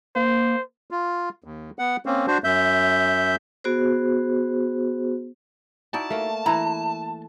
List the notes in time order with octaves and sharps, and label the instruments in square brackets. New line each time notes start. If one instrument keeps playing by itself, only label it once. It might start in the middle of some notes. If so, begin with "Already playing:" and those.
[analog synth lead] A#3 [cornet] C5
[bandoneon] F4
D#2
B3 F#5
A#3 C4 C#4
D4 F#4 C5
F#2 E5 G6
[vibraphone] B3 F#4 G#4 C5
[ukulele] D#4 E4 F#4 [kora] D5 [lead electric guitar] A5
[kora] A3 A#3
[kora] E3 E4 [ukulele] A#5 B5